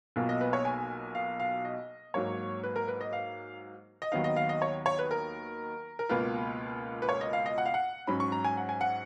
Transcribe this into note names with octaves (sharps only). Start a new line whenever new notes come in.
B1 B2 A#3 F4
D#5
B4
C#5
G#5
F5
F5
D#5
G#2 F#3 A#3 C#5
B4
A#4
B4
D#5
F5
D#5
D#2 D#3 F#3 B3 D#4 F5
D#5
F5
D#5
C#5
C#5
B4
A#4
A#4
C#2 B2 A#3 F4 B4
B4
C#5
D#5
F5
D#5
F#5
F5
F#5
G#2 F#3 C#4 B5
C#6
A#5
G#5
F#5
G#5
F#5